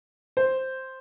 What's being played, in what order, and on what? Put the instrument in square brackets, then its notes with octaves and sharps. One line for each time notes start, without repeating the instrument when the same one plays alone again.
[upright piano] C5